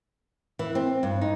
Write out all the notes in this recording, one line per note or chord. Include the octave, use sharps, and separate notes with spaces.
E3
C4
G2
D#4